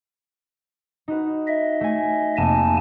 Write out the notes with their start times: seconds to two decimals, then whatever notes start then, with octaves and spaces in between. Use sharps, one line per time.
1.08 D#4 F#4 B4
1.48 D#5 E5
1.81 A3 G#5
2.37 F1 A#3 G#5 A5